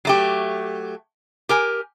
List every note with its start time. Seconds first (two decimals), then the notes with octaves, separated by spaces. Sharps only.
0.05 F#3 A3 G4
1.49 G4 A#4 G#5